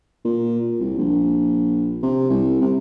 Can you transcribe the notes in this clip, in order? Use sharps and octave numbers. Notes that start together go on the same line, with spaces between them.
A#2
C2
A#1
C3
C2
C3